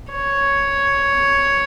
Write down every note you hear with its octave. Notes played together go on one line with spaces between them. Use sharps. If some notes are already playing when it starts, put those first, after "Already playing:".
C#5